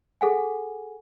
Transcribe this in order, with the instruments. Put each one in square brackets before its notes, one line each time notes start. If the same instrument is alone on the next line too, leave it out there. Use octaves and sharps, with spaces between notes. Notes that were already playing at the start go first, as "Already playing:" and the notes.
[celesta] G#4 A4 F#5 G#5